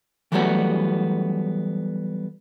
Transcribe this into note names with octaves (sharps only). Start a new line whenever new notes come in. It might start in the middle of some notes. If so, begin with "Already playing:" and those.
E3 F#3 G3 A3 B3 F#4